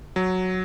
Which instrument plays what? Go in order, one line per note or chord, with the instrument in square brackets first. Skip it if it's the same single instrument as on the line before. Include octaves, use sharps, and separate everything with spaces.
[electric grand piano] F#3